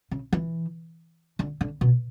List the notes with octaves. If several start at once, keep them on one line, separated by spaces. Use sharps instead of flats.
C#3
E3
D3
D3
B2